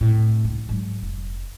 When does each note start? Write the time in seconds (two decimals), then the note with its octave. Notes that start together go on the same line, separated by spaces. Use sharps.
0.01 A2 C3
0.44 C#2 D4
0.69 G#2 F#3
1.02 F1